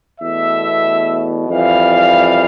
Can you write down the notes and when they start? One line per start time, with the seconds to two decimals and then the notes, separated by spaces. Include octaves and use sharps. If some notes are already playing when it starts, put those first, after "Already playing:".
0.20 E2 B2 A3 E5
1.49 F2 E3 G3 F5